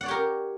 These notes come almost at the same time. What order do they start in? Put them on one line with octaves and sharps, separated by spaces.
F#5 D5 C#5 G4 A#4